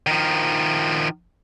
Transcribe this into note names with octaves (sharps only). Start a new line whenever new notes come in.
D#3 F3